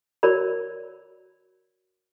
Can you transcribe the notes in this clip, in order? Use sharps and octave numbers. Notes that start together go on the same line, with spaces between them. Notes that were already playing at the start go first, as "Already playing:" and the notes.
F#4 A#4 C#5 D5 B5